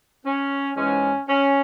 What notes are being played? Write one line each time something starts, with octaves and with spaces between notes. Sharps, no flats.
C#4
G#2 E3 G#3 C#4
C#4